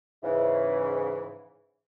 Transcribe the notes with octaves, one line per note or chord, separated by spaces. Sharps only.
G#2 C#3 E3